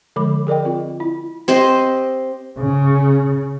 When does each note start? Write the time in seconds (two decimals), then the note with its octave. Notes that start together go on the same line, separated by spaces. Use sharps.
0.16 D3 F3 G#3 A4 B5 D6
0.47 G#4 A#4 D5 D#5 G5
0.65 C4 F4
1.00 E4
1.48 C4 G4 C5 D#5
2.58 C#3